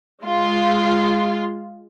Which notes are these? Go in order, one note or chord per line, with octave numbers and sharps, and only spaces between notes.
G#3 F4